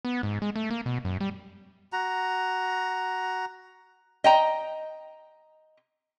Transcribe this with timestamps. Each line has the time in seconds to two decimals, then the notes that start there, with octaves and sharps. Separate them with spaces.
0.05 B3
0.23 G#2
0.42 G#3
0.56 A3
0.71 A#3
0.86 B2
1.05 F#2
1.21 G3
1.93 F#4 A#5
4.24 D#5 G5 A#5